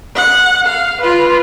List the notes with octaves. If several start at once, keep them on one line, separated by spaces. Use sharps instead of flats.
F#5
F5
F4 B4